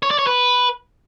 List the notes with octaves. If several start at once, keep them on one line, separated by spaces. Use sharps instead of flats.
C#5
D5
C#5
B4